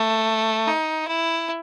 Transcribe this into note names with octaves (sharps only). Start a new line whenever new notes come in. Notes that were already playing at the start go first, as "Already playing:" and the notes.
Already playing: A3
D#4
E4